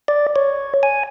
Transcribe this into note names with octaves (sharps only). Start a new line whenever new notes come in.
D5
C#5
G#5